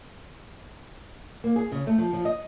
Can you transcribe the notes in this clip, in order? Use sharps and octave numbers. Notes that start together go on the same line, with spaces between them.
A#3
G#4
C#3
A3
F3
F3
D#5